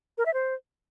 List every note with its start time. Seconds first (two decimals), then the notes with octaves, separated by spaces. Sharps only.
0.18 A#4
0.26 E5
0.34 C5